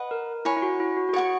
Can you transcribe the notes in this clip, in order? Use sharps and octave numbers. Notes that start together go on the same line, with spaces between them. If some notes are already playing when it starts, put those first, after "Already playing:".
Already playing: B4 D#5 F#5
A#4
E4 C#5 G#5 B5
E4
F#4
E4
F#4
F#4
G#4 C#5 F#5 C#6